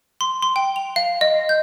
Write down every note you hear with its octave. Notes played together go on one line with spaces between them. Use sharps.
C6
C6
G5
F7
F5
D#5
G6